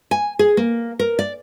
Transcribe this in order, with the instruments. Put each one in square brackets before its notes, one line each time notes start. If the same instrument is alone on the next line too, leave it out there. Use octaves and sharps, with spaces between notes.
[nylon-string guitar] G#5
G#4
A#3
A#4
D5